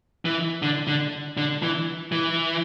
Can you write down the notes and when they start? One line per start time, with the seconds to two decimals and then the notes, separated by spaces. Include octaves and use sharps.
0.25 E3
0.62 D3
0.87 D3
1.37 D3
1.63 E3
2.12 E3